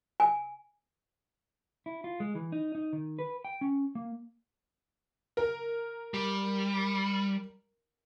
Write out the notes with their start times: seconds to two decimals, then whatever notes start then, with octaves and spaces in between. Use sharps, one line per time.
0.20 G#5
1.86 E4
2.04 F4
2.20 G#3
2.35 E3
2.52 D#4
2.75 D#4
2.93 D#3
3.19 B4
3.45 G5
3.61 C#4
3.95 A#3
5.37 A#4
6.14 G3